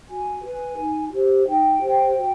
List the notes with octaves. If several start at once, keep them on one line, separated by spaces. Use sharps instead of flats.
F#4 G#5
B4
D#4
G4 C5
D#4 G5
G4 C5
F#4